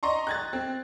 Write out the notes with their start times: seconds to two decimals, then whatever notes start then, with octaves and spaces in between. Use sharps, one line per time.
0.03 D5 D#5 A#5 C6 C#6
0.27 F#6 G#6 A6
0.53 C4